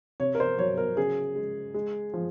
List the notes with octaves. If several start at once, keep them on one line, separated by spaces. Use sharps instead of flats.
C3 C#5
A#4
C5
F#3 C#5
A#4
C#3 G#4
G#3
G#3
F3